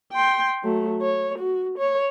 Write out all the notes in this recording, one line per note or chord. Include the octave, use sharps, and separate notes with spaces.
G5 C6
F#3 A3
C#5
F#4
C#5